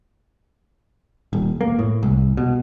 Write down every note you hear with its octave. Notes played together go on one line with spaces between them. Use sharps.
D#1
A#3
A2
C2
B2